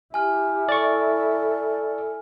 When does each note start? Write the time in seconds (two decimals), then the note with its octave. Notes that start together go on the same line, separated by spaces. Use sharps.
0.14 E4 G4 G#5 F6
0.69 A4 D5 C#6